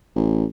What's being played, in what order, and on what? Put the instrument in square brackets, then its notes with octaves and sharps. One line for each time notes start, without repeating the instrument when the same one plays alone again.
[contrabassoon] A1